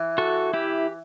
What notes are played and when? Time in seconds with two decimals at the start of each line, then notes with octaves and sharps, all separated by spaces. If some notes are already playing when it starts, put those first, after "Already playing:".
Already playing: E3
0.18 F#4 A4
0.54 E4 G4